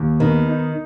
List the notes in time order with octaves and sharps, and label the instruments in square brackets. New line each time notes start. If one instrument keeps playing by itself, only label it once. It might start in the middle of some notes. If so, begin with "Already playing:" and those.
Already playing: [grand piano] D#2
[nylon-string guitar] D#3 [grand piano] B3
[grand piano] D#4